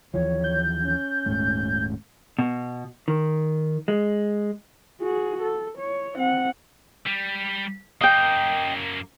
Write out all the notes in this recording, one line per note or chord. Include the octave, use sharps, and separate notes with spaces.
D#2 E3 F3 C#5
G6
C#4
D#1 G#2 A3
B2
D#3
G#3
F#4 G#4
A4
C#5
C4 F#5
G3
F#2 A#3 D#5 G5